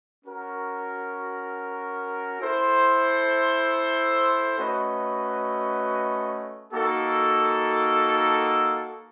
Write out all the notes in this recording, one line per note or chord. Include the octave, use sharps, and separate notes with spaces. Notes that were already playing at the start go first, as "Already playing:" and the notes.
C#4 F#4 A#4
E4 A4 C5
A3 C#4 F#4 B4 D#5
A#3 D#4 F#4 A4